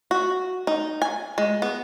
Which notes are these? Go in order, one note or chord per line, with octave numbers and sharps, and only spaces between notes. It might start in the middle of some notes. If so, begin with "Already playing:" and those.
F#4
D#4
G#5
G#3
B3